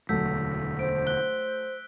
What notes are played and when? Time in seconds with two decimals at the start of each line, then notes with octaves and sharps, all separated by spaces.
0.09 E1 D2 F#3 A3 E6 G6 B6
0.79 C5 D7
1.07 F#6 G7